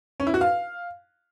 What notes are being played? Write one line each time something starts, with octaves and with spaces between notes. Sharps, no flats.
C#4
E4
F#4
F5